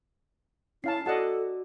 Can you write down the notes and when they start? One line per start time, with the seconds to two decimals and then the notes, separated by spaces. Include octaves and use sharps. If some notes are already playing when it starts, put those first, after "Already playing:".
0.84 C#4 E4 F5 A5 C7
1.06 F#4 A4 D5 D#5 F#5 A5